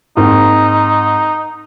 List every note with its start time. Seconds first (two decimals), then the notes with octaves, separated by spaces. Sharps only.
0.17 G#2 A#3 C4 D#4